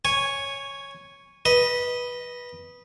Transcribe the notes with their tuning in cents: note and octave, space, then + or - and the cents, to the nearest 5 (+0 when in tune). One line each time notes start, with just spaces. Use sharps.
C#5 +0 G#5 -10
B4 -15 D#5 +0